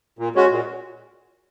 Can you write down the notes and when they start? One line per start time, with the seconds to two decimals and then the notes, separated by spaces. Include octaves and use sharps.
0.19 A#2
0.35 G#3 C#4 F#4
0.50 A#2